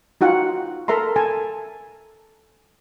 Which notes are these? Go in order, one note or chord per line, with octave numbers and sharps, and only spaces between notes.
D#4 F4 F#4 F#5 G5
A4 A#4 E5 A#5 C6
A4 G#5 A5